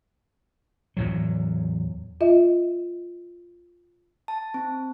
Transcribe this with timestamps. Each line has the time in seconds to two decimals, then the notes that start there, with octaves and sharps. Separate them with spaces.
0.97 E2 A2 F#3
2.21 F4 D#5 E5
4.28 A5
4.54 C4